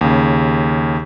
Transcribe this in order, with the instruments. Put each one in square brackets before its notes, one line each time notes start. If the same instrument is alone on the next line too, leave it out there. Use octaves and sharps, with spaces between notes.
[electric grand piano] D#2 C#3